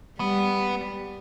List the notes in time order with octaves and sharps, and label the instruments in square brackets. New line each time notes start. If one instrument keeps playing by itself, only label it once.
[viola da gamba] G3 [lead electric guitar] B3